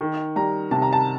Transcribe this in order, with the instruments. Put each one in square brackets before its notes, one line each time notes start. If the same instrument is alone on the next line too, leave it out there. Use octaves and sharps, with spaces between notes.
[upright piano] D#3
G3 A#5
C3 A5
A#5
A5